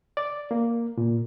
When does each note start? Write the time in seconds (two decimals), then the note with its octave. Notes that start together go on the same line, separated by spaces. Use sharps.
0.17 D5
0.51 A#3
0.98 A#2